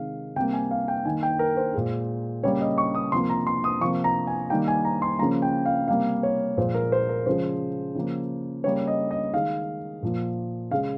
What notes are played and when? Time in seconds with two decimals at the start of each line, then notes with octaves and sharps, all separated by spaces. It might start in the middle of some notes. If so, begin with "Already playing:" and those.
Already playing: C3 D#3 G#3 F5
0.36 C3 G3 A#3 G5
0.53 G#5
0.71 F5
0.88 G5
1.05 D#3 A#3 G#5
1.23 G5
1.39 A#4
1.57 C5
1.74 A#2 G#3
2.43 C#3 G3 A#3 C#5
2.61 D#5
2.78 C#6
2.95 D#6
3.12 C3 F3 A#3 C6
3.30 A#5
3.47 C6
3.64 D#6
3.81 C3 F3 A#3 C#6
4.04 A#5
4.27 G#5
4.50 D#3 G3 A#3 G5
4.68 G#5
4.85 A#5
5.02 C6
5.19 C#3 F3 A#3 A#5
5.42 G5
5.66 F5
5.88 C3 G3 A#3 F5
6.23 C#5
6.57 A#2 F3 G#3 C5
6.74 A#4
6.92 C5
7.09 A#4
7.26 C#3 F3 G#3 C5
7.95 C#3 F3 A#3
8.64 C#3 G3 A#3 C#5
8.87 D#5
9.11 D#5
9.33 D#3 G#3 F5
10.03 A#2 F3 A#3
10.71 C#3 G#3 F5